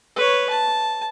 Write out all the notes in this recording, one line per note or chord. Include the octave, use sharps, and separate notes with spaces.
B4 C#5
A5